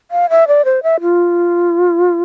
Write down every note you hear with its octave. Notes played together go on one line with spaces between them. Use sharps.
F5
E5
D5
C5
E5
F4